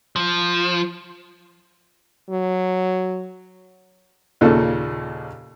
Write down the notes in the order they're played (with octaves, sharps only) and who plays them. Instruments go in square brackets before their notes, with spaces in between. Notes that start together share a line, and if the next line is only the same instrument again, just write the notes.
[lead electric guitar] F3
[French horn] F#3
[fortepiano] D#2 A#2 C#3 A4